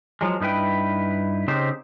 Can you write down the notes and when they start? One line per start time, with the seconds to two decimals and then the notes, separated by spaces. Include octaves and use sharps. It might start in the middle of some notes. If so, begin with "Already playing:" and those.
0.21 F3 F#3 G#3
0.41 G2 D#4 E4 B4 G5
1.48 C#3 C4 D#4 G4 C5